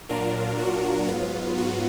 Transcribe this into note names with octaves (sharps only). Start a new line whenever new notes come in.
A#2 F#3 D4 F4 A#4
F#4
G#2 F#3 B3 F4
F#4